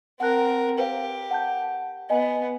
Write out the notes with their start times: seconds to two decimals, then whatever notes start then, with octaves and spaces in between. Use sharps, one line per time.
0.20 C4 A#4 F#5 A5 F#6
0.78 G4 B4 C5 F5
1.31 F#5 A5 G6
2.10 B3 D#5 G#5